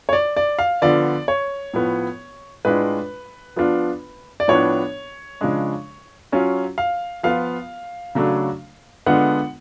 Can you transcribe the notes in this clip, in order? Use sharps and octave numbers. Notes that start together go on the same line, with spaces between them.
C#5
D5
D5
F5
D3 F3 B3 F4 D5
C#5
A2 F3 B3
A2 G#3 D4 F4 B4
F3 B3 D4 F4
D5
A2 F3 B3 D4 C#5
C#3 F3 G#3 D4
F#3 C#4 F4
F5
F3 B3 F4 F5
C#3 F#3 A3 D4
D3 G#3 B3 D4 F4 F#5